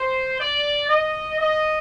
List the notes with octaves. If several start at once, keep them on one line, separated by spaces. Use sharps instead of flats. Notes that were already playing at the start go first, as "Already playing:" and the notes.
Already playing: C5
D5
D#5
D#5